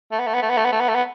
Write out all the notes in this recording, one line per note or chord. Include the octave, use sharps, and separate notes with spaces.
A3
B3
A3
B3
A3
B3
A3
B3
A3
B3
A3
B3